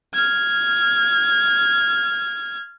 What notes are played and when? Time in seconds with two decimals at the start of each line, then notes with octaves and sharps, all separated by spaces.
0.14 F6 G#6